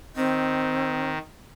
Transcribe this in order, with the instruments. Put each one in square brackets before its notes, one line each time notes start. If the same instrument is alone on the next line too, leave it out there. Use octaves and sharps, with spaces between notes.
[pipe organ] D#3 [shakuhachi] C4